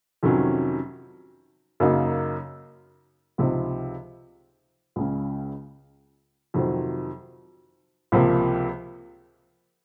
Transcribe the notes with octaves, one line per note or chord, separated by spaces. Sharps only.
F2 C3 D#3 F#3 C#4
F#2 C#3 F#3 A#3 D#4
C#2 C3 F3 C4 D#4
C#2 C#3 G#3 C#4
F2 C3 D#3 F#3 C4
C#2 C3 F3 A#3